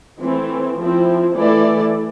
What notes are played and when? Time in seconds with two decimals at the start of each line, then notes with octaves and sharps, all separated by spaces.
0.20 E3 A3 C4
0.78 F3 C4 E4
1.34 E3 A3 E4 A4 D5